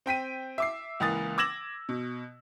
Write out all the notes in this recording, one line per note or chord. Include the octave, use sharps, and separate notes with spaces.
C4 G5 B6 D#7
E5 D6 C7
C#2 E3 A#3 D#6 A6
D6 E6 G#6 A#6 E7 F#7
B2